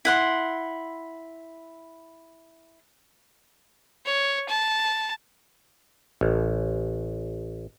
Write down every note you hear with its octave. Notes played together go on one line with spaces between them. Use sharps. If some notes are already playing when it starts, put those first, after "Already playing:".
E4 F#5 C6
C#5
A5
A1